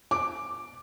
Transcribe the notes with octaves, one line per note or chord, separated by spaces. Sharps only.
D6